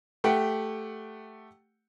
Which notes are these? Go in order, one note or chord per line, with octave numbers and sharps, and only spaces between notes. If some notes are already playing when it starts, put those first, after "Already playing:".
A3 G4 F#5 G5